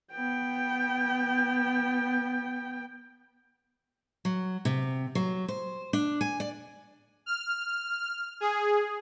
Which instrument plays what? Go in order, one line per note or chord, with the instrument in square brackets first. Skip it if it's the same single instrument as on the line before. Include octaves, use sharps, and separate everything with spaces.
[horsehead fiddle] B3 G5
[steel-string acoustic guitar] F#3
C3
F#3
C5
D4
G#5
D5
[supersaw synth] F6
G#4